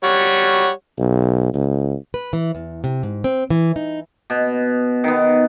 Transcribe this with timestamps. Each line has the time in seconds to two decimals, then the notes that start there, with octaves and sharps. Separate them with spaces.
0.04 G3 C#5 F#5
0.98 B1
1.54 C#2
2.14 B4
2.33 E3
2.55 E2
2.84 C3
3.03 G#2
3.24 C4
3.50 E3
3.76 D#4
4.30 B2
5.04 D#3 B3